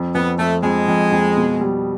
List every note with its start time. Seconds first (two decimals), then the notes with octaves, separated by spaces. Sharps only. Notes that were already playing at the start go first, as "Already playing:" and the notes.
Already playing: F2
0.15 F2 B3
0.39 F2 A3
0.63 F2 G#3
0.88 F2
1.12 F2
1.37 B2
1.61 G3